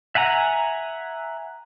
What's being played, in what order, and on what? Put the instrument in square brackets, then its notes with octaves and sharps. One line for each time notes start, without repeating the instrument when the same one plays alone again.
[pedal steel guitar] E5 F#5 G#5 A#5